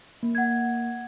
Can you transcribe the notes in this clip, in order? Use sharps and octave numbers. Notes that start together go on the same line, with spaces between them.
A#3
F#5 G#6